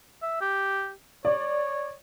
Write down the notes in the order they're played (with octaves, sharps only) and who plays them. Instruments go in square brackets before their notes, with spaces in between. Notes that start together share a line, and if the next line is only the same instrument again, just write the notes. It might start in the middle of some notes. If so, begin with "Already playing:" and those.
[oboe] E5
G4
[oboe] C#5 [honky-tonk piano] D5